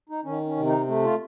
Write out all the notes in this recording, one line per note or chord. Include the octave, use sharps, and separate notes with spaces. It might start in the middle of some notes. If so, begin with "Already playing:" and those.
D#4
D#3 C#4
C#4
C3
D#4
A3
F4